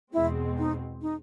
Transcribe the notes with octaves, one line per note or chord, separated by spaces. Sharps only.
E2 B2 G#3 C4 E4
D#4
D#4